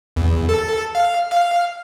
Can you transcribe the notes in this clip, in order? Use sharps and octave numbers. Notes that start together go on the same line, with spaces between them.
E2
A4
F5
F5